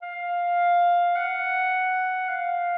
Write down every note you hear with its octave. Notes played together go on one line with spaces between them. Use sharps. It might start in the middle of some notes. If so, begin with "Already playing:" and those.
F5
F#5
F5